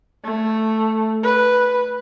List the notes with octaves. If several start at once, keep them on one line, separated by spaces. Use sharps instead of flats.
A3
B4